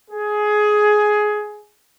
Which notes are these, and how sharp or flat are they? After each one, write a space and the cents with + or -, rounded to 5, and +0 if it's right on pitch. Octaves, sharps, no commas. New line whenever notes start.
G#4 +15